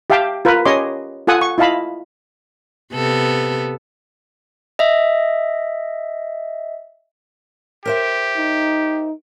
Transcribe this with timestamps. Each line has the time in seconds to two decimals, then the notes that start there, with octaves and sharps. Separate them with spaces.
0.10 G4 E5 F5 G5 A5
0.45 F4 A#4 B4
0.65 C#4 G4 C#5 D#5 C6 D6
1.27 F4 A4 F#5 G#5 D#6
1.41 C#6
1.58 E4 F4 D#5 F5 A5 B5
2.93 C3 B3 A4
4.79 D#5 E5
7.86 G4 A#4 C5 E5
8.37 D#4